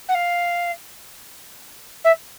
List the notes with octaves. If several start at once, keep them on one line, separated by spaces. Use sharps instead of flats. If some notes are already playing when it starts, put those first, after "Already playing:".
F#5
F5
E5